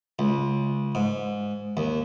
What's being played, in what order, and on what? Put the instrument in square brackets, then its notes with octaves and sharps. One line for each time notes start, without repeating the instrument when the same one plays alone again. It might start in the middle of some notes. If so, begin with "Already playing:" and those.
[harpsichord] C#2
G#2
D#2